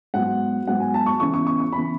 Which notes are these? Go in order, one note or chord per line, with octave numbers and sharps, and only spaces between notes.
G#2 F#3 B3 F#5
G#2 F#3 B3 F#5
G#5
A5
C#6
C#3 E3 B3 C#6
C#6
C#6
C#6
C#3 E3 B3 B5